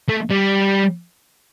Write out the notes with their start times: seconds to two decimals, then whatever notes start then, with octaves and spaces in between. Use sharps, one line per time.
0.09 A3
0.31 G3